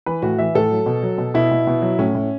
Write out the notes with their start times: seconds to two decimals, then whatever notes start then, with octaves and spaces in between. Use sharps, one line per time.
0.06 E3 B4
0.22 A2 F#4
0.38 E3 E5
0.55 A2 A4
0.71 F#3
0.86 B2
1.03 F#3
1.18 B2
1.34 B2 E4
1.51 B2
1.67 B2
1.82 F#3
1.99 A2 C#4
2.15 A2